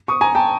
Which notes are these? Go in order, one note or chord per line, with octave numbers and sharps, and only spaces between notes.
C#6 D#6
G#5 A#5
G5 A5